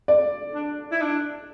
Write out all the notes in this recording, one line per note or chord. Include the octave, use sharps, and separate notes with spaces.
D5
D4
E4
D4